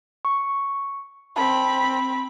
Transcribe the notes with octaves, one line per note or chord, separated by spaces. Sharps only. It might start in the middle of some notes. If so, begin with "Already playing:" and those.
C#6
C4 A5 B5